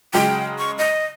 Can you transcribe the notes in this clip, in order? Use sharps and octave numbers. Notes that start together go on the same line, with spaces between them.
C#3 F#3 G#3 G5
C#6
D#5